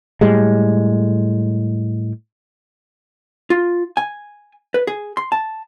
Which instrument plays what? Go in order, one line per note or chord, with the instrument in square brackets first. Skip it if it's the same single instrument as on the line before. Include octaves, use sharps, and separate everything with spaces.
[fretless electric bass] A2 G3 G#3
[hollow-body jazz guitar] F4
G#5
B4
G#4
C6
A5